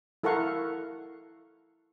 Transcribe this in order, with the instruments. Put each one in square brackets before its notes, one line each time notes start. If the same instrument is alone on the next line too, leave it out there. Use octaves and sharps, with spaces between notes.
[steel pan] E4 A4 A#4 F5 F#5 C#6